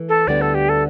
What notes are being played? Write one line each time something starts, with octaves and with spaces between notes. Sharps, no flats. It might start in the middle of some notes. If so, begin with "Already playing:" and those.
Already playing: E3 A3
A4
D2 D3 G3 B3 D5
A4
G4
A4